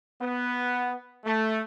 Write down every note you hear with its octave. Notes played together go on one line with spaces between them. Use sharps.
B3
A3